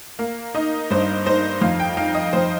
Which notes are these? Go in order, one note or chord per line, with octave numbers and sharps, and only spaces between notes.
A#3 F5
D#4 D#5
G2 C5
D#4 C5
F2 F5
G5
D#4 F5
D#5
F2 C5